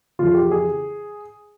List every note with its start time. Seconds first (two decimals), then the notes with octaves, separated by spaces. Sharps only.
0.19 F2 C#3 E3 F4
0.28 G#4
0.35 G4
0.51 G#4